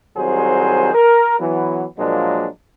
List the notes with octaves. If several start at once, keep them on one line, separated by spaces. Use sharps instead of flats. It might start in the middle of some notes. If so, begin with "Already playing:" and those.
C2 C3 D#3 F#3 G#4 C5
A#4
E3 F#3 B3
A#2 F3 F#3 G#3 A#3 D4